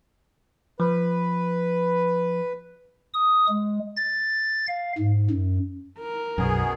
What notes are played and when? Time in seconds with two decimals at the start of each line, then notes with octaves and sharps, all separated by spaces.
0.80 F3 B4
3.14 D#6
3.48 G#3
3.97 A6
4.68 F5
4.98 G#2
5.31 F#2
5.99 A#4
6.38 B1 F#2 B2 B3 G#4